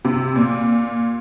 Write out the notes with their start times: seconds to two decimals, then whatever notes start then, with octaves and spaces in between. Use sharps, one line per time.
0.05 C3
0.36 A#2